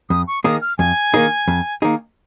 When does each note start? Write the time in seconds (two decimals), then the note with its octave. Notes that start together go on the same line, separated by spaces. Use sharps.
0.10 F2 D#6
0.28 C#6
0.44 D#3 A#3 D#4 G#4 D#6
0.62 F6
0.78 F2 G#5
1.14 D#3 A#3 D#4 G#4
1.48 F2
1.82 D#3 A#3 D#4 G#4